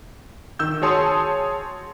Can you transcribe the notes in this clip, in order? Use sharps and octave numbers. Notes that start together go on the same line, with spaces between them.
D#3 E6 G6
F#4 G#4 C#5 A5 C6 D#6